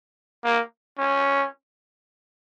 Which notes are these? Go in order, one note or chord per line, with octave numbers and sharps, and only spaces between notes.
A#3
C#4